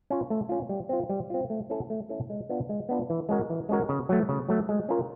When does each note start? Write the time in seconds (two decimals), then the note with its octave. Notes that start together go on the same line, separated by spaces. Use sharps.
0.10 C#4 F4
0.30 A3
0.49 C#4 F4
0.69 G3
0.89 C4 F4
1.09 G3
1.30 C4 F4
1.50 A3
1.70 C#4 E4 A4
1.90 A3
2.09 C#4 E4 A4
2.30 G#3
2.49 B3 D4 F4
2.69 G#3
2.89 B3 D4 F4
3.10 E3
3.29 G#3 C#4 F#4 A#4
3.50 E3
3.69 G#3 C#4 F#4 A#4
3.89 C#3
4.09 F#3 A3
4.29 C#3
4.49 F#3 A3
4.69 G#3
4.89 C#4 F4 A#4